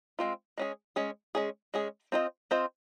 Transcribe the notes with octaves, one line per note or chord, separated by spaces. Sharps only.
G#3 C4 F4
G#3 C#4 G#4
G#3 C#4 G#4
G#3 C#4 G#4
G#3 C#4 G#4
C4 F4 C5 D#5
C4 F4 C5 D#5